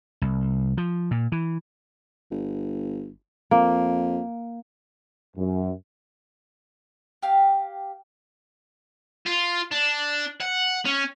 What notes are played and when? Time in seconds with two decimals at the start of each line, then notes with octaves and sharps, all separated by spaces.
0.22 C2
0.77 F3
1.11 A#2
1.32 E3
2.31 G1
3.51 F2 A#3
5.36 F#2
7.22 G4 F5
9.26 F4
9.71 D4
10.41 F#5
10.85 C#4